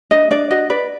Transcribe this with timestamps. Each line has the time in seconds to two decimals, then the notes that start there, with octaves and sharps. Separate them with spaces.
0.11 D4 D#5
0.31 D4 D5
0.50 F#4 D#5
0.70 B4 D5